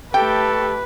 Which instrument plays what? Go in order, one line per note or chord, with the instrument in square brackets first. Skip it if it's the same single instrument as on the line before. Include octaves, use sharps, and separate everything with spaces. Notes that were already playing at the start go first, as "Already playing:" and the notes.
[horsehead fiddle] A3 G4 [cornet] A4 [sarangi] B4 [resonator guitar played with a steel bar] G5